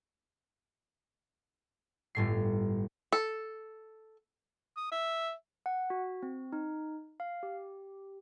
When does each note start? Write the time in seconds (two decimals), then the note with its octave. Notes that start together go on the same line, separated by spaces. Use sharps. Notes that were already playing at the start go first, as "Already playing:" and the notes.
2.15 G1 A2 C7
3.12 A4
4.77 D#6
4.92 E5
5.66 F#5
5.90 F#4
6.23 C4
6.53 D#4
7.20 F5
7.43 G4